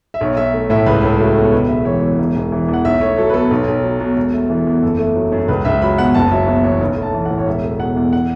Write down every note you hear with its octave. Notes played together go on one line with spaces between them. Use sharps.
E5
B1 C#5
B1 E5
A3
A2 E5
C#2 B4
C#2 A4
A3 F#4
B2 A4
C#5
E1 B4
E1 E5
E3 C#5
E2 C#5
E1
E1
E3
E2
F#5
B1 E5
A3 C#5
F#3 A4
B4
B2 A4
B1
B1
F#3
B2
E1
A3
E3
E2
F#1 A4
A3
F#3
F#2
C#2 B4
C#2 E5
F#3 B5
B2 F#5
F#1 A5
F#3 E5
B2 E5
E2 C#5
B1 B4
A3
A5
E3
A2 F#5
C#5
E1 E5
A3
B2 F#5
E2
F#5